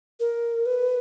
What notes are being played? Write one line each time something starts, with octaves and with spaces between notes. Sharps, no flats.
A#4
B4